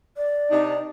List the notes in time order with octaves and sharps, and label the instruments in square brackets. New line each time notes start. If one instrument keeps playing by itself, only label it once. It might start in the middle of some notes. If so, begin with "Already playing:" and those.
[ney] D5
[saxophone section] C3 D4 D#4